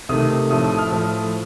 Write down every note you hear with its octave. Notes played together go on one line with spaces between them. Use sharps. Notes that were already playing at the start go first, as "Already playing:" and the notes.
C3 D#3 A3 D#6
A2 F3 A3 D#6
D#6
F6
A2 F3 A3 D#6